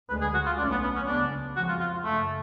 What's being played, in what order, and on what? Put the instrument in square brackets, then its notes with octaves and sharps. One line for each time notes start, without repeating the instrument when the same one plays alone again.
[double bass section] D2 D3 G#3 [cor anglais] B4
[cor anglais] G#4
F#4
F4
[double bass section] B1 B2 A3 C#4 [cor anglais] D4
[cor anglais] B3
B3
C#4
[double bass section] C#2 C#3 G#3 B3 [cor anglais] D4
[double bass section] F2 F3 G#3 [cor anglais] F#4
[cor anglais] F4
F4
[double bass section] F#1 F#2 C#3 [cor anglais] A3